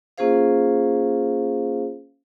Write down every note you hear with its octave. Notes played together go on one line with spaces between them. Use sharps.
A#3 C#4 F4 G#4 C5 F5